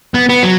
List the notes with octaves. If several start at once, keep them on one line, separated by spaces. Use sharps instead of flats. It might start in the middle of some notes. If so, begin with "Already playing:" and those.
B3
B3
F#3